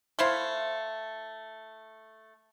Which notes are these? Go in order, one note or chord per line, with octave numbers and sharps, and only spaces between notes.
A3 E4 C5 F5